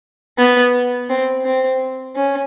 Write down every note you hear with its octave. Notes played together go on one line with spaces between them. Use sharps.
B3
C4
C4
C#4